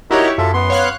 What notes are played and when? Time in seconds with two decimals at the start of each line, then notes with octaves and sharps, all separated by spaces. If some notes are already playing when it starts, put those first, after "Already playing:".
0.11 D#4 E4 F#4 G4 A#4 C#5
0.38 F#2 F4 A4 E5
0.53 B3 C6
0.70 C#5 F5 F#6